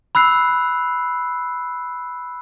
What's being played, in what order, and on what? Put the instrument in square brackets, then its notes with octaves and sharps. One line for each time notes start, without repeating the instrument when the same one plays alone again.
[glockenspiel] B5 E6 F#6 C7